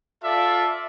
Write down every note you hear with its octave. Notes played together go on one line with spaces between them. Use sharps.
F4 A4 D5 E5 F5